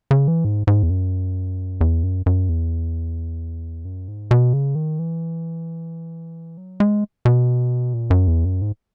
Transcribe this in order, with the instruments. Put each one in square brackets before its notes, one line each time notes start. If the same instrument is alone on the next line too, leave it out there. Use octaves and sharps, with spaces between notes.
[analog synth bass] C#3
E3
G#2
G#2
E2
F#2
E2
F#2
F#2
E2
F#2
G#2
B2
C#3
D#3
E3
F#3
G#3
B2
A#2
F#2
E2
F#2
G#2